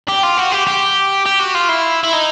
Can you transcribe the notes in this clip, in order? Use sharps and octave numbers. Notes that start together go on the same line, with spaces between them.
G4
F4
F#4
G4
G4
G4
F#4
F4
E4
E4
D#4